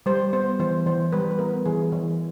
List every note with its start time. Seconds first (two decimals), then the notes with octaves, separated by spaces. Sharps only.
0.06 G3 C5
0.33 B3 C5
0.60 E3 C5
0.86 E3 C5
1.12 G3 B4
1.31 B4
1.39 B3 A#4
1.65 E3 G#4
1.92 E3